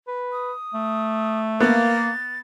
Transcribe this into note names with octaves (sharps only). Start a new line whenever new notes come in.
B4
D#6
A3
A#3 B3 A6